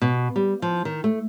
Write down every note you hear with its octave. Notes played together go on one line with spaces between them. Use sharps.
B2
G3
F3
D#3
A3